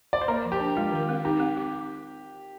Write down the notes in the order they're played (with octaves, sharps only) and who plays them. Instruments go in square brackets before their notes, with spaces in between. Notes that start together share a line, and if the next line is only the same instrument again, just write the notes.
[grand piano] D5
C5
[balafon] A#3 [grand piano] A#4
[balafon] F3
[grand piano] G4
[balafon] D4
[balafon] G#3 [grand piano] F4
[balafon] D#3
C4
[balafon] D#4 [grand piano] G4
[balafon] C4
G4